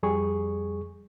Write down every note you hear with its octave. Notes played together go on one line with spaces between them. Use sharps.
F2 G3 G#4 C#6